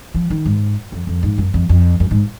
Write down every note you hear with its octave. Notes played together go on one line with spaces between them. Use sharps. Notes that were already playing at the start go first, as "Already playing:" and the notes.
F3
D#3
G#2
F2
F2
G#2
F#2
F2
F2
F#2
G#2